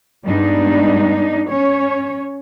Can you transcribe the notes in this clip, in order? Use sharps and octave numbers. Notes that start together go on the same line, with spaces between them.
G2 G3 G#3 B3 D4 D#4
C#4 C#5